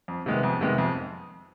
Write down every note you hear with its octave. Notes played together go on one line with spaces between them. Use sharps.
F2
C3 D#3 G#3 B3
F2
C3 D#3 G#3 B3
F2